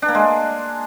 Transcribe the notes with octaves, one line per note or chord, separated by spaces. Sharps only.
D4
A#3
G#3